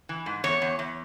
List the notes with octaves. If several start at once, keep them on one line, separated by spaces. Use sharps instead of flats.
E3
G#2
E2 C#5
E2
E2